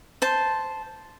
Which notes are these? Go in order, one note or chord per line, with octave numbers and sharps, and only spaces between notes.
C5 A5